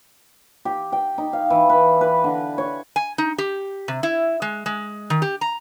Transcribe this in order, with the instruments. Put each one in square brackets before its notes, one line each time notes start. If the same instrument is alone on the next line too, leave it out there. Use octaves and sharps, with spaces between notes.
[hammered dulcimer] G4
G5
D#4
F5
E3
B4
B4
D3
C#5
[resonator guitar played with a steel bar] G#5
D#4
G4
C3
E4
G#3
G#3
D#3
G4
A#5